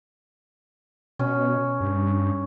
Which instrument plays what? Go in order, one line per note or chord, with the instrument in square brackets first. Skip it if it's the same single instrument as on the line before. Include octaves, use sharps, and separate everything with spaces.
[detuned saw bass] B2 [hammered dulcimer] C#4
[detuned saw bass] G2